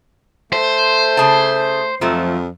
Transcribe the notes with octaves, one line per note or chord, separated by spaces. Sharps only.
A3 C5
C#3 G#4 A5
F2 F3 F#3 A3